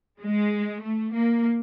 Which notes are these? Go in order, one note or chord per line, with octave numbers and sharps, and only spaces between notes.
G#3
A3
A#3